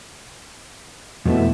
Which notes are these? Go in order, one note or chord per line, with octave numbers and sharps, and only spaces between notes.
F2 B2 A3 E4